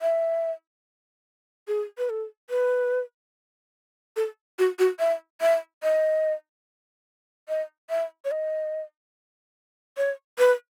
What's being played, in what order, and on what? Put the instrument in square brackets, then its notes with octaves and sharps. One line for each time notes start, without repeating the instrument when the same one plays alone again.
[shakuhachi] E5
G#4
B4
A4
B4
A4
F#4
F#4
E5
E5
D#5
D#5
E5
C#5
D#5
C#5
B4